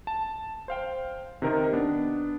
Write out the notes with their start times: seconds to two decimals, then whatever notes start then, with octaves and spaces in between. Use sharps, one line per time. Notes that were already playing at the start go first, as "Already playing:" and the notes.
0.07 A5
0.68 C5 F5 G5
1.42 C3 D#3 A#4 D#5
1.73 B3 D4